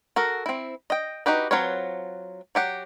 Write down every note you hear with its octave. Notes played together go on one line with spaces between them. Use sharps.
F#4 A4 A#4
C4 E4
D#5 G5
D#4 F#4 G4 B4
F#3 C4 F4 B4 C#5
F#3 G4 F#5